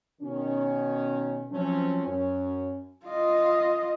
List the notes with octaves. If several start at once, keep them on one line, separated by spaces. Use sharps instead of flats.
B2 D#3 C#4
F3 F#3 A3 C4 C#4
F#2 C#4
F4 D#5